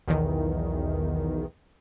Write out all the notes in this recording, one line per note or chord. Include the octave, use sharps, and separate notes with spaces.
B1 E2 D#3